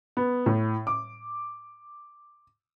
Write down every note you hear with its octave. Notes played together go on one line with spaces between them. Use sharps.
B3
A2
D6